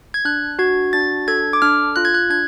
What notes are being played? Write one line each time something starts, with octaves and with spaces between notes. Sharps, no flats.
G#6
D4 F#6
F#4 G#6
D4 A6
A4 G#6
D6
D4 F6
F4 F#6
G#6
F#6
D4 G#6